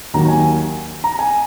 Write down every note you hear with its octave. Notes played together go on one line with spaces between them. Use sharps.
D#2 D#3 F#3 A#5
G#5
A#5
G#5